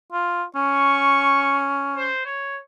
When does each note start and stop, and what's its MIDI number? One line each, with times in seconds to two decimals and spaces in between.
0.13 0.43 65
0.56 2.10 61
0.56 1.67 85
1.97 2.22 72
2.26 2.58 73